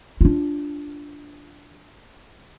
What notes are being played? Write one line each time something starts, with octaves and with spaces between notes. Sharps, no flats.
D4 F4